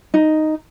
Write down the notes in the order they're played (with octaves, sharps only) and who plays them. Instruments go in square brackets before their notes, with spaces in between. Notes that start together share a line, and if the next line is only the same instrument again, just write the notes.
[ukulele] D#4